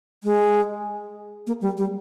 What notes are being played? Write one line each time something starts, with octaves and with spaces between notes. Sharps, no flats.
G#3
A#3
G3
G3